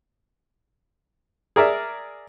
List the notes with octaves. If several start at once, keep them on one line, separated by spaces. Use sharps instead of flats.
G#4 A#4 D5 E5